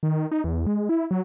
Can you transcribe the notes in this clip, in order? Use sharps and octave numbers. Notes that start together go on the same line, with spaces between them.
D#3
D#4
E2
G#3
E4
F#3